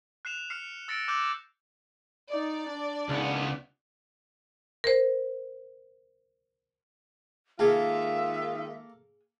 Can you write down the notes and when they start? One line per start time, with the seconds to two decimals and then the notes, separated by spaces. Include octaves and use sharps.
0.25 F#6 C7 E7 F7
0.50 F6 C7 C#7
0.88 E6 A6 A#6 C#7 D7
1.08 D6 E6 F#6 G6 E7
2.31 D#4 D5
2.70 D4
3.09 C#2 B3
4.84 A#4 C5
7.59 D#3 G#3 A#3 F4 G#4 A4 E5